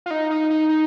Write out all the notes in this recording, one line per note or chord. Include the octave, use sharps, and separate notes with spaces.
F4
D#4
D#4
D#4
D#4